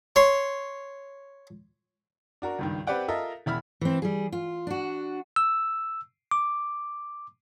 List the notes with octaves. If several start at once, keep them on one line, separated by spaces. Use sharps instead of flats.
C#5 C6
D4 F#4 A#4
C#2 G2 D#3
C4 G4 B4 D5 F#5 G5
F4 A4 A#4 D#5 E5
E1 E4 B5 F6
E3 C4
G3 G#4
F4
D4 F#4
E6
D6